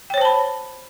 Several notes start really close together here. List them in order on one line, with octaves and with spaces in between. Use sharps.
G5 C#5 C5 A5 B5